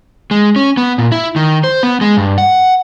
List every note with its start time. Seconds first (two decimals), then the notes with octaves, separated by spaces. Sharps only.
0.31 G#3
0.56 C#4
0.77 B3
0.98 A#2
1.12 E4
1.36 D#3
1.64 C5
1.83 B3
2.01 G#3
2.17 G2
2.38 F#5